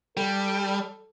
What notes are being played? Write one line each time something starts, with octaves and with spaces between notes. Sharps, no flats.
G3 A4